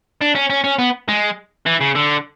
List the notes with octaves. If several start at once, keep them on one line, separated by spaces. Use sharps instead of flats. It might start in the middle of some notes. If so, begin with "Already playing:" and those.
D4
C#4
C#4
C#4
B3
G#3
E3
C#3
D3